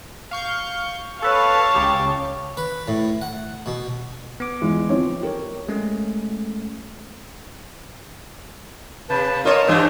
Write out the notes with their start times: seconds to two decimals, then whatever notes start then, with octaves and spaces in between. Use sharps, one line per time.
0.31 F5 C#6 G6
1.22 A4 B4 C#5 F5 A5
1.75 C#2 C#3 G4
2.57 B4
2.88 A2
3.22 F#5
3.66 B2
4.40 B3 D6
4.62 E2 G#3
4.89 F3 C4 C#5
5.23 G4 A#4 C#5
5.69 G#3 A3 C#4
9.10 C3 B4 A5
9.45 F4 A#4 C#5 D#5 A5
9.67 G2 E3 G3 D4 C5 E6